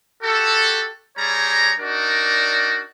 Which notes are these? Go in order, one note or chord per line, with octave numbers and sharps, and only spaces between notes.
F#4 G4 A4
G3 G#4 C#5 A#5
D4 D#4 F#4 A#4 D5